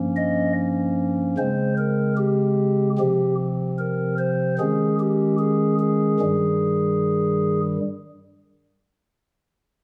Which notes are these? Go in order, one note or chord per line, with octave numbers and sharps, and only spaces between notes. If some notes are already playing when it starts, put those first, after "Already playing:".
Already playing: G2 F3 A#3 C#4
D#5
C#3 G#3 C4 C5
A#4
G4
C3 F3 C4 G4
A#4
C5
D#3 G#3 C#4 G#4
G4
G#4
G#4
G2 D#3 G3